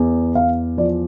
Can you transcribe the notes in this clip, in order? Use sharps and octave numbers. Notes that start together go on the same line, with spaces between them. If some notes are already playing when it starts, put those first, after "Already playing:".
Already playing: E2
E2 F5
F3 D5